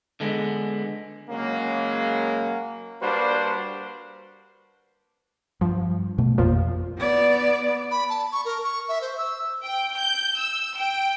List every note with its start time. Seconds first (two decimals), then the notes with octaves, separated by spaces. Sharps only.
0.20 D3 G#3 B3
1.30 C#3 F#3 G#3 A#3
3.02 G3 A#3 D4 F#4 B4 C5
5.61 G2 F3
6.18 B2 A3
6.38 A1 F2 A#2 F3
6.98 B3 D5
7.91 B5
8.09 A5
8.32 C#6
8.45 A#4
8.64 C#6
8.89 E5
9.01 C5
9.18 E6
9.64 G5
9.97 G6
10.37 E6
10.77 G5